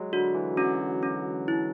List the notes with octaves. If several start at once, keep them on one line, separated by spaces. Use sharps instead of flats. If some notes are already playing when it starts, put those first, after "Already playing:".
Already playing: F#3 G#3
D3 F#4
E3
F#3 C#4
C#4
E4